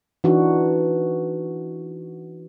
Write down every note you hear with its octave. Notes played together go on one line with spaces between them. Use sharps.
E3 D4 D#4 F#4